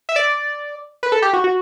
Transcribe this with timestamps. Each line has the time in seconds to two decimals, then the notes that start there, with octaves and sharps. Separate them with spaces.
0.09 E5
0.16 D5
1.03 B4
1.12 A4
1.22 G4
1.33 F#4
1.44 F#4